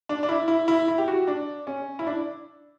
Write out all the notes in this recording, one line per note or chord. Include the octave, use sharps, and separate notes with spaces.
D4
D4
E4
E4
E4
E4
G4
F#4
D4
C#4
E4
D4